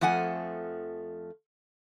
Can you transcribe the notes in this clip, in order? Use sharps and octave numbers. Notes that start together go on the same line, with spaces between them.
F2 F3 A3 F#5 G#5